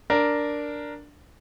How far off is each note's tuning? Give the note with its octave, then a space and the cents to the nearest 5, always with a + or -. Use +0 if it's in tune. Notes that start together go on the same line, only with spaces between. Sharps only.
D4 +0 A#4 +0